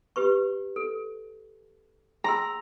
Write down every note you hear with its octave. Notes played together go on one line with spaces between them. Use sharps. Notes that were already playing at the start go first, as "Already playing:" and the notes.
G4 B4 C#6
A4
G#4 A#5 C6 E6